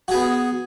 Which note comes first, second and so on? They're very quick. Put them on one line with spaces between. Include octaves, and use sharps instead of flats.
F#4 G#4 B3